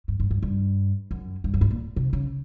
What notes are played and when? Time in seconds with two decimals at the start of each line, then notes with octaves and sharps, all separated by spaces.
0.08 G2
0.20 G2
0.31 G2
0.43 G2
1.11 F#2
1.44 G2
1.54 F#2
1.61 G#2
1.71 A#2
1.96 C3
2.13 C#3